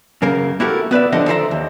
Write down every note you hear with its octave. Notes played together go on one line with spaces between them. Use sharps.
F#2 C#3 A#3 A#4
A#3 E4 F#4 G4 A4 A#4
B3 B4 D5 E5
D#2 D3 F3 D4 D#5 F#5
A4 C5 D5 E5 F5 A#5
D#2